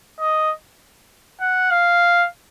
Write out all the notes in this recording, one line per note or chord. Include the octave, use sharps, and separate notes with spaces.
D#5
F#5
F5